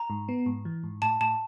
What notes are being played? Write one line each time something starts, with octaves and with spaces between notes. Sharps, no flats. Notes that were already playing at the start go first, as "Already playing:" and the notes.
Already playing: A#5
G#2
B3
G#2
E3
G#2
A2 A5
A2 A5